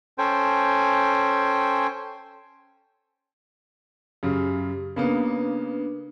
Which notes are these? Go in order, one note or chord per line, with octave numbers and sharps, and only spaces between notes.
C#4 A4 C5 G5 G#5
F#2 C#3 G4
C#3 A#3 B3 D4 B4